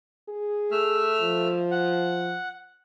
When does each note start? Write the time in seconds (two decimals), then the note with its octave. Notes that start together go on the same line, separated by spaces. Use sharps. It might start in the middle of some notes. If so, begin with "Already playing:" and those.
0.28 G#4
0.71 A3 E5 F6
1.21 F3
1.71 F#5